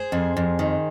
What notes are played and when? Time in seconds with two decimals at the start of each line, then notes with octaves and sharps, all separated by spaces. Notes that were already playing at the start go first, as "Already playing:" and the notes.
Already playing: G#4 C5
0.12 F2
0.37 F2
0.59 D#3